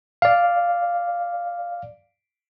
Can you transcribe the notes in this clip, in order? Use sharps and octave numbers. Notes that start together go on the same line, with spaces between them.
D5 F5